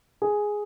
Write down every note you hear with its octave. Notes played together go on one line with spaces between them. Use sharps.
G#4